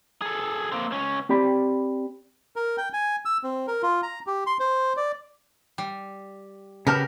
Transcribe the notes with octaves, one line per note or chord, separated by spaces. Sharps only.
G#4 A4
A#3 C4
C#2 C#4
C4 G4 D5 B5
A#4
G5
G#5
E6
C4
A#4
F4
A#5
G4
C6
C5
D5
G3
C#3 B3 G4 A#4 A5 F6